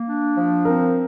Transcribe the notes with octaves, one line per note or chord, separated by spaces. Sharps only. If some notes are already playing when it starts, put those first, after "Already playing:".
Already playing: A#3
D4
F3
C4 A#4